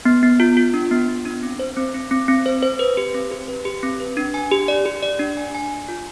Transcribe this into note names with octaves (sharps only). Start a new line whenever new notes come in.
B3
B3
F4
F4
D4
B3
B3
D4
C4
C5
C4
C4
C4
C4
C5
C5
B4
G4
C4
G4
B4
G4
C4
B4
D4
G#5
G4
D5
G4
D5
D4
G#5
G#5
G#5
F4